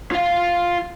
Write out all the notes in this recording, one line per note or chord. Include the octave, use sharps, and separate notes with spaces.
F4 F5